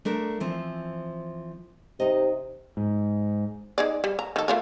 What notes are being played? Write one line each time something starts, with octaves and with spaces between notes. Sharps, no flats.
A3 D4 A#4
E3 F3 C4
C3 D#4 D#5
G#2
D#4 G#4 D5
G3
A#5
D#3 A4
A3 F4 A#4